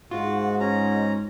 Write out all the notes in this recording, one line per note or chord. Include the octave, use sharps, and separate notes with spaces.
G#2 F4 F#4
C#4 A#5